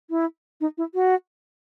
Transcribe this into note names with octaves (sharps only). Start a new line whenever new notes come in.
E4
D#4
E4
F#4